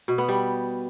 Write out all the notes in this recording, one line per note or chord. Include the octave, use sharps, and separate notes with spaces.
B2
B3
G3